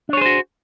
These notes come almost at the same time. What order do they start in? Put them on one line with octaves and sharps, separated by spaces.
D4 C#5 G#4 C5 F#4